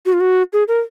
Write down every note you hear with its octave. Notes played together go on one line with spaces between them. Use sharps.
F#4
F4
F#4
G#4
A#4